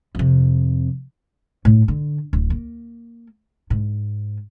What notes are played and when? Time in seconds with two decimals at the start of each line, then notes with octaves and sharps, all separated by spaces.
0.15 F2 C3
1.65 A2
1.88 D3
2.33 D1
2.50 A#3
3.70 G#2